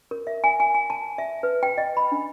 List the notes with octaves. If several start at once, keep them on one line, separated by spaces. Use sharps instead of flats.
A#4
E5
G#5
G#5
G#5
A5
E5
B4
G5
D#5
B5
D4